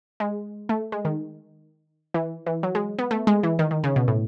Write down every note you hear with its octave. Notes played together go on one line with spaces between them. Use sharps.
G#3
A3
G#3
D#3
E3
E3
F#3
G#3
B3
A3
G#3
E3
D#3
D#3
C#3
B2
A2